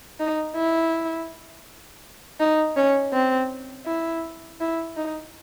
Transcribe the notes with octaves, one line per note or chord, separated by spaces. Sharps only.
D#4
E4
D#4
C#4
C4
E4
E4
D#4